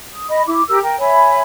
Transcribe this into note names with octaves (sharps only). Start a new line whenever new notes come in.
D#6
D#5 B5
E4 D6
G4 A#4 E6
A#4 G5
C#5 E5 G#5 B5